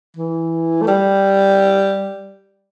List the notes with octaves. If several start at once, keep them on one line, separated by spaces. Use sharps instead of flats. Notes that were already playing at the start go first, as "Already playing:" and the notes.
E3
A3
G3